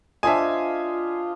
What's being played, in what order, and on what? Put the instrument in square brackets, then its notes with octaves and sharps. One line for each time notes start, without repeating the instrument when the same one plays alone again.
[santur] D4 C5 D#5 [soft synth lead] F4 [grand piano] E5 G#5